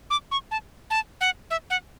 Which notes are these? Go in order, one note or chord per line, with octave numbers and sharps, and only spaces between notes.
D6
C#6
A5
A5
F#5
E5
F#5